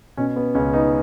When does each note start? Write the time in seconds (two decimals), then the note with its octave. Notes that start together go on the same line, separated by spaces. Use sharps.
0.17 B2 C#4
0.36 B3
0.55 C#2 C#4
0.73 B3 D#4